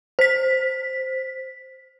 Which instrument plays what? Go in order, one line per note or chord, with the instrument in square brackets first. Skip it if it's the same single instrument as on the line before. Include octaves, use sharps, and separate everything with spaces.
[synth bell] C5 B6